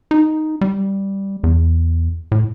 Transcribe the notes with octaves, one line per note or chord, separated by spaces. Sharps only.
D#4
G3
E2
A2